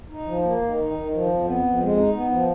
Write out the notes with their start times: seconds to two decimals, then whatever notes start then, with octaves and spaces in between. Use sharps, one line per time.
0.10 D#4
0.26 F3
0.43 A#3
0.61 D#3
0.78 D#4
0.94 D#3
1.11 F3
1.29 F2
1.45 B3
1.63 F2
1.80 G#3
1.97 D#4
2.14 B3
2.31 F3